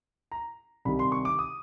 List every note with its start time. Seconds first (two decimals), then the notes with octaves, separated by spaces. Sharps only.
0.32 A#5
0.85 C2 C3 D#3 B5
0.99 C6
1.12 C#6
1.25 D6
1.39 D#6